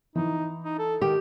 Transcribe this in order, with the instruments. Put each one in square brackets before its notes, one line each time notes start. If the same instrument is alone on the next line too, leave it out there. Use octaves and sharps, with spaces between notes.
[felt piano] E3 [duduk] D#4
[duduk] D#4
A4
[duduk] D#3 [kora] G4